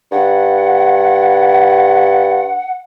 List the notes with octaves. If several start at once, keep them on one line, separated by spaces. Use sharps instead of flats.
G2 F#5